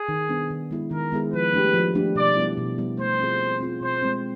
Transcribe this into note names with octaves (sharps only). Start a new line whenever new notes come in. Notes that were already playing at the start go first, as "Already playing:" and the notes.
Already playing: G#4
D#3
G3 B3 D4
D#3
G#3 B3 E4 G#4
D#3 A#4
G#3 B3 E4 G#4
F3 B4
A3 D4 G4
F3
A3 D4 G4
B2 D5
G3 B3 E4
B2
G3 B3 E4
A3 C5
C4 F4 G#4
A3
C4 F4 G#4
B2 C5
G#3 C4